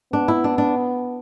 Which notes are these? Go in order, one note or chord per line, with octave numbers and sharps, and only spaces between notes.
B3 D4
E4
D4
D4